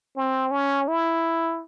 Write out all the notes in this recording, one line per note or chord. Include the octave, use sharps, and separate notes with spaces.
C4
C#4
E4